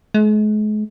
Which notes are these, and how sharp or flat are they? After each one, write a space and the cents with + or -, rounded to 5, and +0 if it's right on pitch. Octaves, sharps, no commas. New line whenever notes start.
G#3 +40